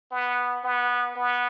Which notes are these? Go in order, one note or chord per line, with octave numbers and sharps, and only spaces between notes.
B3
B3
B3